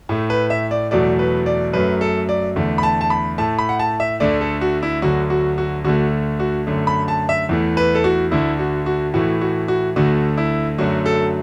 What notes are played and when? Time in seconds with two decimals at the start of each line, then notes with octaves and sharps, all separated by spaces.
0.09 A2 A3
0.30 B4
0.50 E5
0.71 D5
0.91 E2 B2 F#3 A3 D5
1.19 B4
1.46 D5
1.73 F#2 F#3 A3 B4
2.01 A4
2.29 D5
2.56 E2 D3 A3
2.78 B5
2.83 A5
3.01 A5
3.10 B5
3.38 A2 A3 A5
3.59 B5
3.69 F#5
3.79 A5
4.00 E5
4.20 D2 D3 A3 D5
4.41 A4
4.61 F#4
4.83 E4
5.02 D2 D3 F#3 F#4
5.30 F#4
5.58 F#4
5.85 D2 D3 A3 F#4
6.40 F#4
6.67 F#2 D3 A3
6.87 B5
7.08 A5
7.29 E5
7.49 E2 E3 A3
7.77 B4
7.95 A4
8.04 F#4
8.31 D2 D3 A3 E4
8.59 F#4
8.86 F#4
9.14 A2 E3 A3 F#4
9.41 F#4
9.68 F#4
9.96 D2 D3 A3 F#4
10.37 E4
10.78 F#2 D3 F#3 A3 F#4
11.06 A4